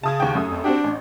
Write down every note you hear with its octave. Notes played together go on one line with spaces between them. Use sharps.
C#3 A5 D#6 G#6
D#2 F#5 G5
F#2 A3 D#6
F2
C4 D4 F#4 G4
A1